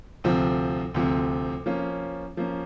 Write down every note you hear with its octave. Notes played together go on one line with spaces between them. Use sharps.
D2 C3 F3
D2 C3 F3
F3 A#3 C#4
F3 A#3 C#4